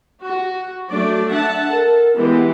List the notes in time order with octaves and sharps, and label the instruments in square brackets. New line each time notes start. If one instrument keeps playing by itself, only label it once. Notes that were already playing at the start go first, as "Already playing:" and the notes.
[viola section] F#4
[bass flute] F#3 [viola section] A3 D4 D5
[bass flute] D4 [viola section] E5 F#5 A5
[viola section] A4 [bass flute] A#4
[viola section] E3 G#3 G4 [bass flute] B3